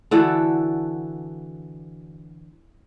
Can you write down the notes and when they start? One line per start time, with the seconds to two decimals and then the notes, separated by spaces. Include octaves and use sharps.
0.11 D3 E3 F#4 A4